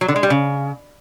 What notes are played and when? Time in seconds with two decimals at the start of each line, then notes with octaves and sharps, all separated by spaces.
0.01 F#3
0.08 D3
0.16 G#3
0.23 G3
0.30 C#3